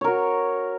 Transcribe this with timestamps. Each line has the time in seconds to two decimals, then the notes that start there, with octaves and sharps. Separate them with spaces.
0.01 C#5
0.04 A#4
0.08 F#4